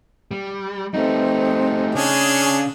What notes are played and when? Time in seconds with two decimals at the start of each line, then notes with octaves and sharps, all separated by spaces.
0.31 G3
0.94 G3 A3 C4 D#4
1.95 C#3 C#4 D4 G#4